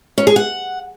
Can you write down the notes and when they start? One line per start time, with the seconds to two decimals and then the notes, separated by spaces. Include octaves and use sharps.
0.18 C#4
0.27 G#4
0.36 F#5